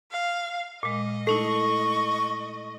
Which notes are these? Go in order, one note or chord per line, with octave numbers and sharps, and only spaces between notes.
F5
A#2 G#3 D#5
A3 D#4 E4 A4 C#6